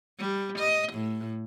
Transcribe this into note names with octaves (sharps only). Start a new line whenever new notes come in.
G3
D#5
A2